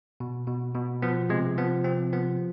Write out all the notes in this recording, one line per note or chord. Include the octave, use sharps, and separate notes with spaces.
B2
B2
B2
F3 B3
C3 G#3
F3 B3
C3 C4
F3 B3